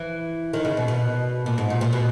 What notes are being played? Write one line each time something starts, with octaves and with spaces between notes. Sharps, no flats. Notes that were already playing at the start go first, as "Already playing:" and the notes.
Already playing: E3
D#3
C#3
B2
B2
A#2
G#2
A#2
A#2
B2